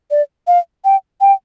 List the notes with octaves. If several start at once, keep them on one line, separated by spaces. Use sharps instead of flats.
D5
F5
G5
G5